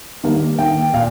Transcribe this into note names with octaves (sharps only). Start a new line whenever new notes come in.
D#3 G3 A#3
D#3 A#3 G5
A#2 F5